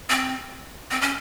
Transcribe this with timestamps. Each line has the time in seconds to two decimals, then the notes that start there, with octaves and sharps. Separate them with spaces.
0.10 C4
0.91 C4
1.01 C#4